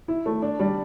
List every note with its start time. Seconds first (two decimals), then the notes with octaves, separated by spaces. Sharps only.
0.08 E4
0.26 A3
0.42 D4
0.59 G3